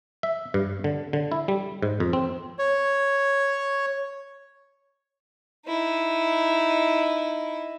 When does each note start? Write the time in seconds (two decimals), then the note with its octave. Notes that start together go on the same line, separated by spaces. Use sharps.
0.23 E5
0.54 G2
0.84 D3
1.13 D3
1.32 E4
1.48 G3
1.83 G#2
2.00 F2
2.13 C4
2.59 C#5
5.66 D#4 E4